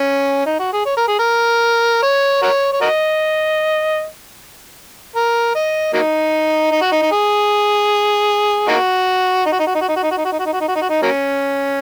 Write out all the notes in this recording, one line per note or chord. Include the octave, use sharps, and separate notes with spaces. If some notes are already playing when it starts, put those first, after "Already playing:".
Already playing: C#4
D#4
F#4
G#4
C#5
A#4
G#4
A#4
C#5
F#4 A#4 C#5
C#5
F#4 A#4 D#5
A#4
D#5
F#3 A#3 D#4
D#4
F#4
D#4
D#4
G#4
A#3 D#4 F#4
D#4
F#4
D#4
F#4
D#4
F#4
D#4
F#4
D#4
F#4
D#4
F#4
D#4
F#4
D#4
F#4
D#4
F#4
D#4
F#4
D#4
F#3 A#3 C#4